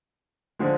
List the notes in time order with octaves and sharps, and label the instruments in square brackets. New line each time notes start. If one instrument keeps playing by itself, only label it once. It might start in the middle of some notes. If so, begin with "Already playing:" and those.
[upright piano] D3 F3 G#3